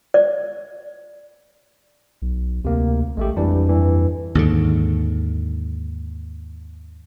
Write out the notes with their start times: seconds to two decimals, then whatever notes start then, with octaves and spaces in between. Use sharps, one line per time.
0.14 D5
2.22 B1
2.65 D2 C3 A#3
3.17 A1 G#3 A3 G4
3.37 F2 E3 G3 D4
3.69 G2 E3
4.35 D#2 G#2 D3